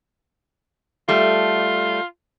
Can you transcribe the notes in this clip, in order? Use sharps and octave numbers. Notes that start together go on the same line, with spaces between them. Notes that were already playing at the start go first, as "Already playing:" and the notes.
G3 A3 F4